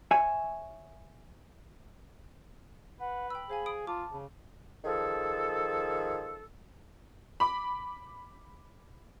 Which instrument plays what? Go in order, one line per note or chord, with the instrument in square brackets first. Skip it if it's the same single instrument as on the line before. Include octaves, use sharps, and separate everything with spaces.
[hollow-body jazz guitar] C#5 E5 G#5
[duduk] B4 [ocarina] F#5
[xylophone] G5 E6 [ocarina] B5
[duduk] G#4 [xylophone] C5 F5 G#5
[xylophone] D#6 D7
[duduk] F4 [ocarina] A5 [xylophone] D6
[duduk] C#3
[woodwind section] D#3 F3 G#4 A4
[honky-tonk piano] B5 D6